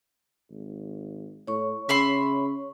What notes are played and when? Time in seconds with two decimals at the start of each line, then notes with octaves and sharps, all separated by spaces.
0.51 G#1
1.47 A2 C#5 C#6
1.89 C#3 E5 B5 C6